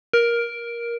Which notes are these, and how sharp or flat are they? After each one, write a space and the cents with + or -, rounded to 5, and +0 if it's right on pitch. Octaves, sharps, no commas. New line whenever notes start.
A#4 +10